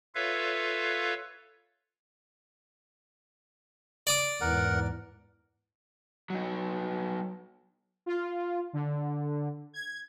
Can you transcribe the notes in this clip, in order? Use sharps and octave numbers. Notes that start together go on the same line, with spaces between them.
F4 A4 B4 C#5 E5 F5
D5 D6 D#6
E2 G#2 A#4 F#5
F#3 D#4
F4
D3
G#6